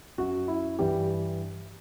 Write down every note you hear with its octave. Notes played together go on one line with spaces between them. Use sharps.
F#2 F#3 F#4
E4
G2 E3 G3 G4